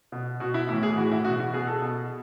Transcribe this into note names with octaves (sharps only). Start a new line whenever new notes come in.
B2
B2 F#4
E4
A2 E3 E4
G#4
A2 E3 F#4
E4
B2 F#4
F#4
B2 G#4
A4
B2